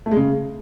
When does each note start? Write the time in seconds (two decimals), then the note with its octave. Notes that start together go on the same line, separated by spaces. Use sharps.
0.06 A3
0.11 G#3
0.17 C#3